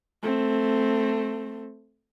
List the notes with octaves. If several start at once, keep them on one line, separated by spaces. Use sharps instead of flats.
A3 C4